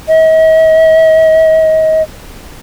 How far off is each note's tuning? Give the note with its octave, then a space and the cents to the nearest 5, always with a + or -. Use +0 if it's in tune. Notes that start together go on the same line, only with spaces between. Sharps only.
D#5 +45